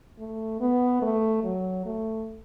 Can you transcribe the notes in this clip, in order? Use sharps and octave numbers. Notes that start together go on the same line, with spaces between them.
A3
B3
A3
F#3
A3